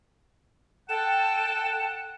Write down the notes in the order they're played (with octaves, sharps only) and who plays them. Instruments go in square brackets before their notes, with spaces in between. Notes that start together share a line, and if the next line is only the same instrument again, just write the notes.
[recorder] A4 [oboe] F#5 [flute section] G5 A5 [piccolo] E7